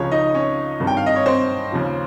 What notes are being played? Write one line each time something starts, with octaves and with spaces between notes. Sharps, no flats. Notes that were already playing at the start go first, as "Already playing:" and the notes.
Already playing: C#2 C#3 F3 C#4 C#5
D#4 D#5
C#4 C#5
G#1 G2 D#3
G5
F5
D#5
C#5
C4 C5
D#2 C#3 F3